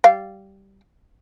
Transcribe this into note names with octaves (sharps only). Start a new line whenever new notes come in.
G3 F5